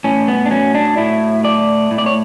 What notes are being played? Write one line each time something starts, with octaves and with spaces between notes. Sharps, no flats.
A2 C#4
B3
D4
F#3 C#4
D4
A2 E4
A3 D5
A2
D5
C#5